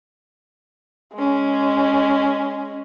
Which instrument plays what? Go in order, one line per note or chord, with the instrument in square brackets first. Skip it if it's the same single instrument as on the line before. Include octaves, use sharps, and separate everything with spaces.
[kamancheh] G#3 C#4